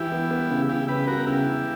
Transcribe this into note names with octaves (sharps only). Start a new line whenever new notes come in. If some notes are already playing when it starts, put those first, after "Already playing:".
Already playing: E3 E4 G4
B3
B3
C#3
C#3 E4 G4
C#3 G4 B4
B3 F#4 A#4
C#3 E4 G4
C#3